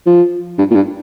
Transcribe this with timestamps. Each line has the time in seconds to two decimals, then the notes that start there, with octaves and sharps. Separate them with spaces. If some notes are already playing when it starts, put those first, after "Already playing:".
0.06 F3
0.58 G2
0.71 A#2
0.75 G2